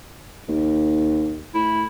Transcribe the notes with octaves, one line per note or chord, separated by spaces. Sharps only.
D#2
A2 E4